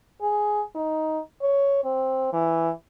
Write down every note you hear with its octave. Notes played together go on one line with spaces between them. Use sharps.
G#4
D#4
C#5
C4
E3